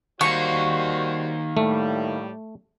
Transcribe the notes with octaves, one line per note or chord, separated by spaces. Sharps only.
D#3 G3 A#3 F#4 C5 C#6
A2 G3 A3